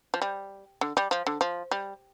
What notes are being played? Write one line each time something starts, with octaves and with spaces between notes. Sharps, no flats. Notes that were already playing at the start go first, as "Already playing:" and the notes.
F3
G3
D3
G3
F3
D3
F3
G3